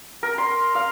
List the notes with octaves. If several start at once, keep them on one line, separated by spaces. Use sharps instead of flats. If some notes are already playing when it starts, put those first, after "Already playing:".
A#4
C6
F5